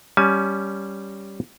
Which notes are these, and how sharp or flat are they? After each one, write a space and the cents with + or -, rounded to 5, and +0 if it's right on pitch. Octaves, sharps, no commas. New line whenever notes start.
G3 +0 C#4 +0 G#5 +30